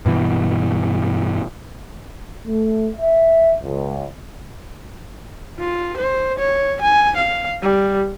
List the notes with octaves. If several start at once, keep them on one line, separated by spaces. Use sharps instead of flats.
G2 B2 E3
A3
E5
C#2
F4
C5
C#5
G#5
F5
G3